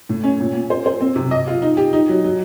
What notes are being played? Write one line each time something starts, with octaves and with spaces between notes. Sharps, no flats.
A2
C#4
A#2
A#2
C5
C5
C4
C3
D#5
F4
D#4
G4
D#4
F#3
F#3